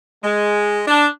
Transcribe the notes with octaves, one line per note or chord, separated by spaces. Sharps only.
G#3
D4